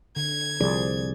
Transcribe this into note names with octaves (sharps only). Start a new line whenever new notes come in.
D3 G#6
C2 F3 G#4 D5